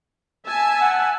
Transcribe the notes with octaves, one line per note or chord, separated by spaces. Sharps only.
E5 G#5 A5
F#5